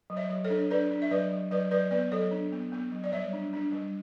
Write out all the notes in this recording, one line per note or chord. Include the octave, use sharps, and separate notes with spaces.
F#3
C#5 E5
F#3
A4 C#5
D4
D4 B4 D5
D4
E5
F#3 B4 D5
F#3
F#3 B4 D5
F#3 B4 D5
B3 B4 D5
F#3 A4 C#5
D4
B3
B3
F#3
D5
G3 C#5 E5
D4
D4
G3